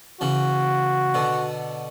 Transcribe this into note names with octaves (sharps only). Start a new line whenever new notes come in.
C#3 E3 F#4
B2 D3